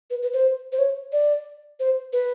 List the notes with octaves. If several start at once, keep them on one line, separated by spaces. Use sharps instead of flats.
B4
B4
C5
C5
C#5
D5
C5
B4